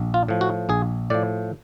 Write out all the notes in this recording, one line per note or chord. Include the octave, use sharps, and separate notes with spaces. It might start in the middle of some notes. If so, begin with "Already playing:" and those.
Already playing: A#1
F4
A2 F3
F#4
A#1 G#4
A2 F3 D5